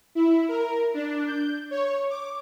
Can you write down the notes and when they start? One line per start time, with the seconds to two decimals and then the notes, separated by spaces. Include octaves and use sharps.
0.15 E4
0.49 A#4
0.94 D4
1.27 G6
1.71 C#5
2.10 D6